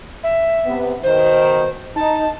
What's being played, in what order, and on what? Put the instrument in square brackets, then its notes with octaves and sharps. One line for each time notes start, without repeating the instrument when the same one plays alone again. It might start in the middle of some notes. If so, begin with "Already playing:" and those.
[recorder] E5
[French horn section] C3 B3
[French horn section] B2 D#3 [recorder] C5
[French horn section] D#4 [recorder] A5